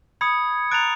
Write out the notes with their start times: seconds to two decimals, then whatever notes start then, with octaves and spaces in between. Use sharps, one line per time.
0.21 B5 D#6 G#6 C#7
0.71 A#5 F#6 A6 D7 F7